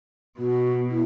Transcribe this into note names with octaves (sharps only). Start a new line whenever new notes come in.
B2 F#4
E4